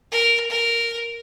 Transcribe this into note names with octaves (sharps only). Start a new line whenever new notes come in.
A#4
A#4